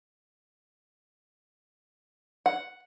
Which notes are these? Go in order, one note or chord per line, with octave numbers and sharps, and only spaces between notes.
F#5